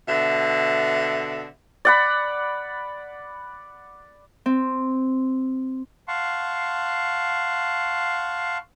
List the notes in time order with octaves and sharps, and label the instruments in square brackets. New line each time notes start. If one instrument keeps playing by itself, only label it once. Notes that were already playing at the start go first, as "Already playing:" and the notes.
[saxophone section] B2 D3 E5
[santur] D5 F#5 B5
[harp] C4
[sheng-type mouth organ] F5 F#5 A5 C6 C#6